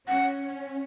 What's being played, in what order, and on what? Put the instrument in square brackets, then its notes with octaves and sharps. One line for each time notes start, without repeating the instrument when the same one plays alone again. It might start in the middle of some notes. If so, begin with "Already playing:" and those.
[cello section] C#4 [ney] F#5